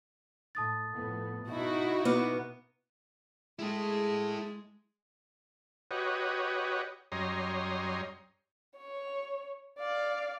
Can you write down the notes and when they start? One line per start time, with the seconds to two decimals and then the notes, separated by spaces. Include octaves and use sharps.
0.55 A2 A5 D#6 A6
0.91 F2 A2 B3
1.50 G#2 B2 D#4 E4 F#4
2.05 B2 B3 D6 F6
3.59 G#3 E4 G#4 A4
5.91 F#4 G4 B4 C#5 D#5
7.12 F#2 G3 C#5 D#5 A#5 C6
8.77 C#5
9.79 D5 F5